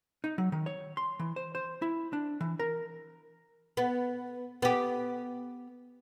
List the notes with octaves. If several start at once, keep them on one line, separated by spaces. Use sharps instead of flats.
D#4
F#3
D#3
C#5
C6
E3
C5
C5
E4
D4
E3
A#4
B3
B3 G4